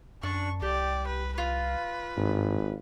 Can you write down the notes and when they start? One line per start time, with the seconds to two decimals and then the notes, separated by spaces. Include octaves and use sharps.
0.23 F#2 D4 C#6
0.62 C2 G4 D5
1.07 B4
1.38 F4 B4
2.17 G#1 G2